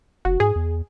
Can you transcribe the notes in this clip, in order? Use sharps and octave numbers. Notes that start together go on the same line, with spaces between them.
F1 F#4
G#2 G#4
E2